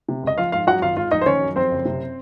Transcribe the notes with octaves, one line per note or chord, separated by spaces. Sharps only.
C3
C#2 D#5
F3 F4 F5
G#2 F4 F5
F#2 F#4 F#5
G#1 F4 F5
G#2 F4 F5
A#1 D#4 D#5
C5
D#3 C#4 C#5
F#2
F2 C4 C5
F#1
C3